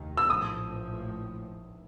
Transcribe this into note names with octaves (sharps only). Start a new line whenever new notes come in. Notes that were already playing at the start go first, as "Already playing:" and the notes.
Already playing: F1 D#2 D#3
E6
A#1 A2 F3 D#6